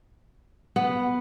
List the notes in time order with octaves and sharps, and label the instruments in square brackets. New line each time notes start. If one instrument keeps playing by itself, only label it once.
[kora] B3